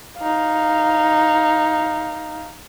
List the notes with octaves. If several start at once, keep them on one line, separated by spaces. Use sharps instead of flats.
D#4 F5